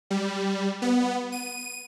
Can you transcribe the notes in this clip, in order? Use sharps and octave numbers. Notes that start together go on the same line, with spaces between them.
G3
B3
D#7